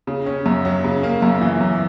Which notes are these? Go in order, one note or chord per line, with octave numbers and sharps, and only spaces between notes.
C#3
C#4
F#2
F#3
C#3
A#3
F#2
E3
F#2